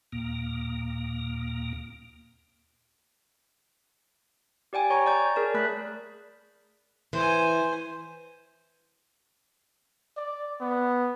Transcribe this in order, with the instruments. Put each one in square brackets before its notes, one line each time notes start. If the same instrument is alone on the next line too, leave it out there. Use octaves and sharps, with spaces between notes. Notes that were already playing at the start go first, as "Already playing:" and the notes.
[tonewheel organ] D#2 A#2 A#3
[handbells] G4 D5 G5 G#5
C#5 G#5 A#5 C#6
D5 A#5 G6
G#4 A#4 D5 A5
A3 A#4 B5 F#6 B6
[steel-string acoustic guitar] E3 [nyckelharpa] C5 G#5
[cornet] D5
B3